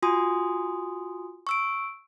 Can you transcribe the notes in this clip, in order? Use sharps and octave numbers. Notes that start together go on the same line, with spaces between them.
F4 F#4 G#5 C6 D#6
C#6 E6 D7